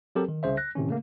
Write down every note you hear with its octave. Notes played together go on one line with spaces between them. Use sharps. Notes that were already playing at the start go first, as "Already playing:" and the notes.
F#3 C4 G4 A4 A#4
D#3
C2 C#3 C5 E5
F#6 A#6
A2 C3 D#3 C#4
C#3 A3 A#3